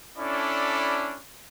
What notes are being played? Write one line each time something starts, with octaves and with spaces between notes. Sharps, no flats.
C#4 D4 E4 A4 D5 B5